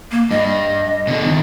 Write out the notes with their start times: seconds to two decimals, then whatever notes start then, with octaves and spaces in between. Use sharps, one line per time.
0.12 A#3
0.31 G2 D#5
1.07 B2 D3
1.24 G2 D#3